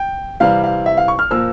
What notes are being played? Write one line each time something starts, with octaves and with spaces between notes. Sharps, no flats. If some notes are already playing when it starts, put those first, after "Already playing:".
Already playing: G5
C3 E3 G3 C4 F5
F5
E5
F5
C#6
F6
A#2 F3 A#3 E6